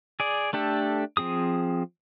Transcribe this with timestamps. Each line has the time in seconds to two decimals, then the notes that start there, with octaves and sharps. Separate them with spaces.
0.20 G#4 D5
0.53 A3 D4 G4 A4
1.17 F3 C4 G#4 D#6